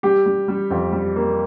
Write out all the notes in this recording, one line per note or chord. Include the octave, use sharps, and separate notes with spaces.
G3 G4
G3
G3
F2
G3
A#3